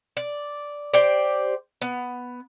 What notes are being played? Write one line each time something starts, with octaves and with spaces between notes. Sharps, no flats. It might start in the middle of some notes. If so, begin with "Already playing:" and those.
D5
G4 C5 D5
B3